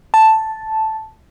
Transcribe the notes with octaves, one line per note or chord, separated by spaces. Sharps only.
A5